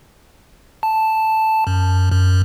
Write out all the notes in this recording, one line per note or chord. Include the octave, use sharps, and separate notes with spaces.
A5
F#2
F#2